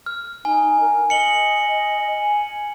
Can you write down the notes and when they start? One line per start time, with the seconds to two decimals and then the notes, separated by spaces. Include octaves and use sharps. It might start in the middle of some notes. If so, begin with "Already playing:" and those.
0.06 F6
0.45 D#4 G#5
0.81 A#4
1.10 D#5 C#7 F#7 G7
2.14 G#5